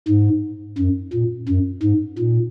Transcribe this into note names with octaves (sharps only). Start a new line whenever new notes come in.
G#2
F#2
A#2
F#2
G#2
A#2